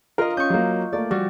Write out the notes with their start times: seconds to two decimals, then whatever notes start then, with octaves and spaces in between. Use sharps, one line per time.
0.18 F4 A#4 D#5
0.37 C#4 C#6 D#6 G6
0.50 F#3 A#3
0.93 A3 A#3 D5
1.11 G3 F#4